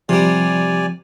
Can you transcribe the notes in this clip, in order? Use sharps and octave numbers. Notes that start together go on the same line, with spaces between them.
C3 F3 G3 D5 G#5